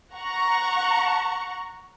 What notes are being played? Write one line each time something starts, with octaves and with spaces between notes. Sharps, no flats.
F#5 A#5 C#6